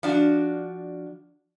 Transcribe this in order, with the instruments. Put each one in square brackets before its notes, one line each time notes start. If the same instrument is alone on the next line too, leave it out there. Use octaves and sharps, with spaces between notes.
[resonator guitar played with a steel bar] F3 D4 F#4